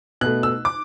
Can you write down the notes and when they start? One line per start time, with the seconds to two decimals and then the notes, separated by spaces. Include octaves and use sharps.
0.21 B2 A3 F#6
0.43 E6
0.65 D6